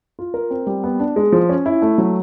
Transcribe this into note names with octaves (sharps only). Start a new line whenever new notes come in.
F4
A#4
C4
G3
B3
D4
G#3
F3
C#4
E4
A3
F#3